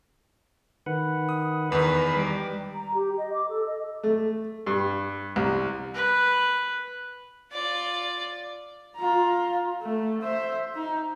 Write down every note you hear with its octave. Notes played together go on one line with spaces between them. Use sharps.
D#3 B4 F#5
D#6
E2 D#3 B4
G3 D6
A#5
G4
D#5
D6
A4
D#5
A3
G2
C2
B4
F4 D5
F4 A#5
A3
C5 E5
D#4